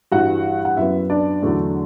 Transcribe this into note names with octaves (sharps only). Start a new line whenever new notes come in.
G2 E3 G3 F#4 F#5
F#5
F#2 F#3 B3 E4 E5
D4 D5
E2 D3 F#3 A3